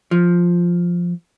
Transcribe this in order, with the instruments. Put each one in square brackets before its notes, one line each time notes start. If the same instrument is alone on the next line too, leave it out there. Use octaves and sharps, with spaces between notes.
[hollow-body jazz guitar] F3